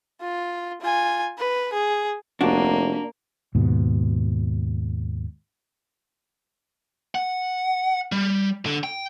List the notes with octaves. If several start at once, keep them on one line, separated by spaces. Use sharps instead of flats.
F4
F4 G#5
B4
G#4
F1 A#3 D4 F#4
D#2 G#2 B2
F#5
G3
D3
G5